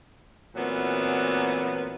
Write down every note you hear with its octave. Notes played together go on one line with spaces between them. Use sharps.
A#2 E3 F#3 B3 C4